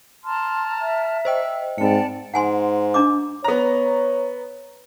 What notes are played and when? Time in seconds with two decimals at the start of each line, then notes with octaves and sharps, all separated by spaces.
0.24 A5 A#5 C6 F6
0.81 E5
1.25 C5 D#5 G5 E6
1.78 G#2 C4 D5 G5 A5 C#7
2.34 G#2 F#5 G#5 C6
2.94 D4 D#5 D6
3.44 B3 C#5 A#5